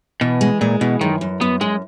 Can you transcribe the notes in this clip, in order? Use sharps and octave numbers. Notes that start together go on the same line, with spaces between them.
B2 E3
G#3
A#2 G#3
B2 E3
F#2 D#3
F#2
F#2 B3
F#2 G#3